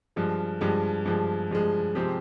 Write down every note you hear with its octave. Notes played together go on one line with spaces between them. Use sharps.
G2 F3 G#3
G2 F3 G#3
G2 F3 G#3
G2 F3 G#3
C3 F3 G#3 C4 G4